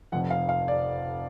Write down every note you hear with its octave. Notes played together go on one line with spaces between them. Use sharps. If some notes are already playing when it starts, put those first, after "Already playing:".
F1 F2 F3 F#5
F5
F5
D5